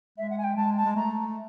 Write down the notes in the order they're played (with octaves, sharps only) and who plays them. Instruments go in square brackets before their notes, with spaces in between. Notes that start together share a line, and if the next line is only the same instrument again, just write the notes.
[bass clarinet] G#3 [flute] E5
[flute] F#5
G#5
G5
[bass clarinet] G#3 [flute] A5
[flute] A5
[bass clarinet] G#3
[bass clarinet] A3 [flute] A#5